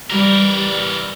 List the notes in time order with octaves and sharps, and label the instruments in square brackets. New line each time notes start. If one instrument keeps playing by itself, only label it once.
[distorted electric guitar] E3 A#4 [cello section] G3